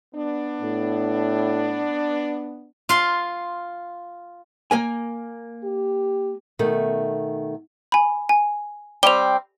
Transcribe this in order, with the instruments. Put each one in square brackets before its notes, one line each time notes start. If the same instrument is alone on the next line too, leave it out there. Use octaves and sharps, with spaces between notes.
[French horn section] B3 D4
[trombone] A2
[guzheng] F4 C6
[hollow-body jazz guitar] A#3 A#4 G#5
[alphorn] G4
[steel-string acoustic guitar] B2 D#3 A3
[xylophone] G#5 B5
G#5
[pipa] G3 C4 [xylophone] F7 G7